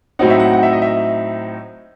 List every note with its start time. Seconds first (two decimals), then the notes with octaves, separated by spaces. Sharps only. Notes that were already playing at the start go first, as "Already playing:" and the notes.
0.19 A2 F#3 C4 D#4 F#5
0.30 E5
0.40 F#5
0.53 F#5
0.63 E5
0.73 D#5
0.82 E5